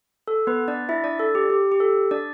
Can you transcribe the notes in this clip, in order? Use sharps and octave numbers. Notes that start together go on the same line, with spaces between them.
A4
B3 B4
D4 D5
E4 E5
D4 D5
A4
G4
G4
G4
A4
D4 D5